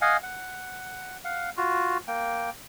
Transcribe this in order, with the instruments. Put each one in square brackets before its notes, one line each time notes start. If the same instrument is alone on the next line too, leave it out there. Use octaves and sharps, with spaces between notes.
[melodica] D#5 F5 F#5 G#5
F#5
F5 F#5
F4 F#4
A#3 G5